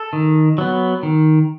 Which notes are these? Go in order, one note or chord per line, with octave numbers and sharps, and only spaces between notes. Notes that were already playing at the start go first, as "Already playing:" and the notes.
Already playing: A4
D#3
F#3 B3
D#3